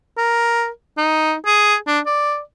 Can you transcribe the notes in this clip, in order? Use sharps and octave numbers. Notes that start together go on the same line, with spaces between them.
A#4
D#4
G#4
D4
D5